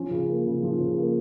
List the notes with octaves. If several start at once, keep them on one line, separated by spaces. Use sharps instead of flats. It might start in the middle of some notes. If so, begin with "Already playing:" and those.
Already playing: F3 C#4
C#3
A#3
C#3
F3
C#3
A#3